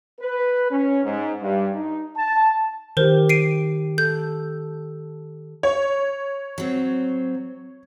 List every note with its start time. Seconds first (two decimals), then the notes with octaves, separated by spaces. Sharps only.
0.21 B4
0.71 C#4
1.04 G#2
1.42 G2
1.74 D#4
2.17 A5
2.97 D#3 G4 A#4 C5
3.29 C7 D7 D#7
3.98 A4 G6
5.63 C#5
6.58 F#3 C4